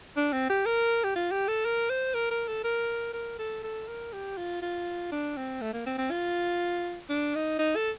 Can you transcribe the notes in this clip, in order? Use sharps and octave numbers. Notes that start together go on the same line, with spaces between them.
D4
C4
G4
A#4
G4
F4
G4
A4
A#4
C5
A#4
A#4
A4
A#4
A#4
A4
A4
A#4
G4
F4
F4
D4
C4
A3
A#3
C4
C4
F4
D4
D#4
D#4
A4